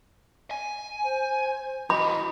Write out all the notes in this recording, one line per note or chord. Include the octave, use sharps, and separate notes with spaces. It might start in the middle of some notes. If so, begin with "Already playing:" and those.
G#5
C5
E4 F#4 D#5 B5